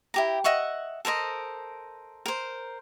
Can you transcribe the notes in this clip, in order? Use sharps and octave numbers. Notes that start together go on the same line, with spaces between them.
E4 G4 A#5
D#5 E5 F#5 C#6
A4 A#4 C5 D#5
A#4 C5